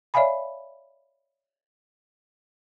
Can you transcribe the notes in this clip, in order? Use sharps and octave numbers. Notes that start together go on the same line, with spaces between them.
C#5 D5 E5 F5 G#5 B5